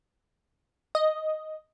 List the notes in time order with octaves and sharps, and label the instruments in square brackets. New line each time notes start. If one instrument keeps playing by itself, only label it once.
[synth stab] D#5